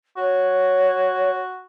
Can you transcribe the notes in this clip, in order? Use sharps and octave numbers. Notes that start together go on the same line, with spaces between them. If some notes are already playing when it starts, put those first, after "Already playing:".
F#4 C#5